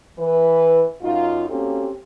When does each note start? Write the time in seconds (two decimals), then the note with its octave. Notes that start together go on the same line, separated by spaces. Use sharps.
0.19 E3 B4
1.03 F#2 D#4 F4
1.49 A#3 C4 C#4 F#4 G4 A4